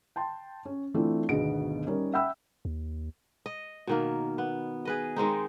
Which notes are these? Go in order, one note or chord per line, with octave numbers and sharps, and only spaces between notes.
G5 A5 C6
C#4
E3 A3 C4 D4 E4 F4
G#1 D2 B2 B3 G#4 D7
G3 C#4 D#4 A#4
E5 F#5 G5 B5 E6
D#2
D#5
B2 D#3 A#3
B3
G#4 B4 D#5
D#3 G#3 C4 D#4